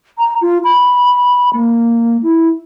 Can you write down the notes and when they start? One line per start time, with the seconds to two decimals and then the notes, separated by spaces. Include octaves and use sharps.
0.18 A#5
0.42 F4
0.64 B5
1.53 A#3
2.23 E4